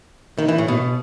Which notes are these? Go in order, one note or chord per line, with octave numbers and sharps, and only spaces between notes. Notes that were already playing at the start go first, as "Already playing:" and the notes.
D#3
E3
A2
B2